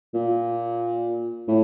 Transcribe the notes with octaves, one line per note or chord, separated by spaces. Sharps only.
A#2
A2